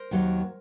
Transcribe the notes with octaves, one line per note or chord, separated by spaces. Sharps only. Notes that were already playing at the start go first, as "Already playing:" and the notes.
Already playing: A#4 C5
D#2 D#3 F#3